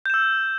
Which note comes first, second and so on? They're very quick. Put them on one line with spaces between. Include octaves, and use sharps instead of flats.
G6 E7 E6